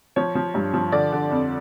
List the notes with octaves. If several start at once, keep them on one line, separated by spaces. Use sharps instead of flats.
F3 C#5
F3
G2
F3
D3 D5
D3
F2